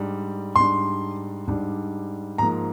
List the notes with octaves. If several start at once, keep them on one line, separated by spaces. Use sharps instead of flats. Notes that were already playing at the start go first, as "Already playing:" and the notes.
Already playing: G#2 G3 D4
G#2 G3 D4 C6
G#2 G3 D4
G#2 F3 A#3 A#5